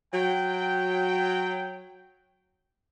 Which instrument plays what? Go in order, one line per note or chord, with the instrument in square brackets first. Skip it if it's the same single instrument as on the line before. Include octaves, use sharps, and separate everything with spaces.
[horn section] F#3 G5